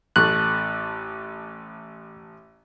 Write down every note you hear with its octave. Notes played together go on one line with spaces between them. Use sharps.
A1 A3 F#6